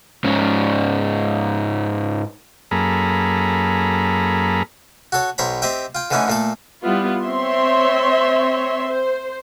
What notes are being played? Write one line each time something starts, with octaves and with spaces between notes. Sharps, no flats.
G#2 C#4
F#2 A#3 G#4 A4 A#5 B5
F#4 A4 C#5
B1 C5 C#5 A#5 B5
C4 G4 D#5 E5 G5
F4 G5
D3 E3 A3 C#4 D#4 E4
A#2 A3 A4
G3 B3 E4 F4
C4 C#5 E5 C6
C5